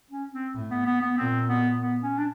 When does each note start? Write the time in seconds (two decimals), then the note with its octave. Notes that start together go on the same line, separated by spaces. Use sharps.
0.11 C#4
0.32 C4
0.54 A2
0.70 B3
0.86 B3
1.01 B3
1.18 A#2 C4
1.49 B3
1.81 B3
2.02 C#4
2.18 D4